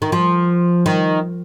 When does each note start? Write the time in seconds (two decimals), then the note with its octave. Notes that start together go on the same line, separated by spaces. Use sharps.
0.02 D#3
0.12 F3
0.86 D#3